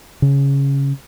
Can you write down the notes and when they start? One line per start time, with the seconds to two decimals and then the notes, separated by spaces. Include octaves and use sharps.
0.22 C#3